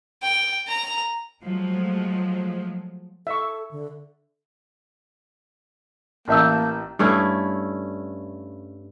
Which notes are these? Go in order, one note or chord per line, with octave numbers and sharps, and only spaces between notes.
G5
A#5
F3 F#3 G#3 A3
A4 E5 C#6
D3
A1 A#3 E5 A5 E6 G6
G2 A3 C#4 E4